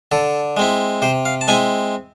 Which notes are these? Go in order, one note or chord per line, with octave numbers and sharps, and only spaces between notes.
D3 A4
G#3 C4 E4
C3 C5
F5
A5
G#3 C4 E4 G#5